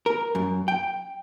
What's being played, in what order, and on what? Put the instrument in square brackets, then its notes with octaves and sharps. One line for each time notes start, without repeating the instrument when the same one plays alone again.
[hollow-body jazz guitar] A#4
F#2
G5